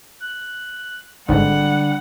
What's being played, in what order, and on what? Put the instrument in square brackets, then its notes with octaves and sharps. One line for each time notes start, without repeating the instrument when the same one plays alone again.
[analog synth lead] F#6
[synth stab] G#1 [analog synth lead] D3 [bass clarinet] G3 [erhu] F#5